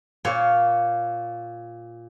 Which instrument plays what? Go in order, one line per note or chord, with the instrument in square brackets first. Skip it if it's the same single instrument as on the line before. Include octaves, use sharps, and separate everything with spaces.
[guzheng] A#2 C#5